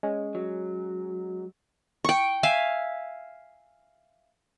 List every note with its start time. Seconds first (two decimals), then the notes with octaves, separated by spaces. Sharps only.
0.03 G#3 C#4
0.35 F#3
2.04 G5 C#6
2.43 E5 F5 G#5